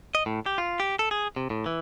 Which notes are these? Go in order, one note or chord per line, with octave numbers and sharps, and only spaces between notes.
D#5
A2
G4
F4
G4
A4
G#4
C3
A2
E3